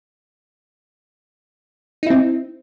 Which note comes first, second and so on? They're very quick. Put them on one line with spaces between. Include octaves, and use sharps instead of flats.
D#4 E4 C4